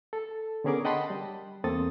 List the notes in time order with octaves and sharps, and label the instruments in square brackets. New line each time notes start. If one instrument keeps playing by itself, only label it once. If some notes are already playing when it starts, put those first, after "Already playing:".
[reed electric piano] A4
D3 B3 C#4 G#4 A#4 D6
D#5 F#5 G5 A5 B5 C6
G3
E2 A#3 C4 A4 D#6 A6